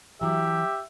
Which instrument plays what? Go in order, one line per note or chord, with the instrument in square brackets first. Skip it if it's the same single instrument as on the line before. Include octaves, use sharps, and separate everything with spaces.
[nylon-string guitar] E3 F#3 [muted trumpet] G4 [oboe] E5